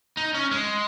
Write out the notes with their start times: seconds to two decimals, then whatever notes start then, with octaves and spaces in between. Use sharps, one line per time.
0.17 D#4
0.34 C#4
0.51 G#3